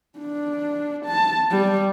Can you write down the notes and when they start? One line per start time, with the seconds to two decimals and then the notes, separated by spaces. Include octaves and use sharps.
0.18 D4
1.05 A5
1.50 G3